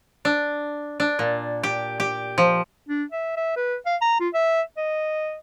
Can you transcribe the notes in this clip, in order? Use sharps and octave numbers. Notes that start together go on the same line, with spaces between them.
D4
D4
A#2
G4
G4
F3
D4
E5
E5
B4
F5
A#5
F4
E5
D#5